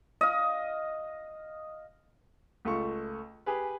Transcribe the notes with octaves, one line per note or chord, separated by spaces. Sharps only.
D#5 F5
C#2 A3 F4 C#6
G4 G#4 B4